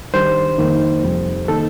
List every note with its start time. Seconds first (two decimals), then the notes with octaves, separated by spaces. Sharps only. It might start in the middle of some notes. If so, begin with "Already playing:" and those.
0.14 D#3 G3 D4 C5
0.58 F2 D#3 A#3 D#4
1.03 F2 C3 G3
1.48 D#3 A#3 D#4 A4